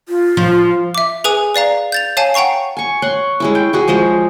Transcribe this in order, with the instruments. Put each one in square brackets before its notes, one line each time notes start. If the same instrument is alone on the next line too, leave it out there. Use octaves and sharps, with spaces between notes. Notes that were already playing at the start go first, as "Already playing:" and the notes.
[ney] F4
[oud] F3
[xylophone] E5 D6
G#4 B4 G#5 D#6
B4 D5 F5 A#5
G6 A6 F7
C#5 F5 G#5 A5
F#5 G5 A#5 C#6 C7
[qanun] G#5 C#6
C#5 F#5 C6
G#3 C#4 E4
G5
E4 F#4 G#4
F3 G#3 D#5 E5